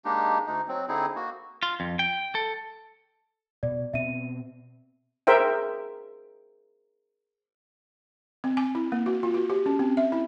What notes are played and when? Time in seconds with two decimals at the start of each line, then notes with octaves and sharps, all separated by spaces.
0.05 G#3 A#3 D4 D#4 G4
0.46 D2 D#4
0.68 F#3 C4
0.89 D3 C4 D#4 E4 G#4
1.16 A#3 F#4
1.63 F4
1.80 F2
1.99 G5
2.35 A4
3.63 B2 D5
3.94 B2 C4 E5 D#7
5.27 G#4 A#4 C5 E5 G5
8.44 C4
8.57 G#5
8.75 E4
8.92 A#3
9.06 F#4
9.23 F4
9.34 F#4
9.50 G4
9.66 C#4
9.79 C4
9.97 E5
10.12 E4